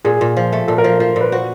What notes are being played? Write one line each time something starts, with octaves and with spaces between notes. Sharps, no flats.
A#2 G#4
A#2
F3
A3
A#2 A4
A#4
F3
F3 C5
A#2 B4
F#4 C5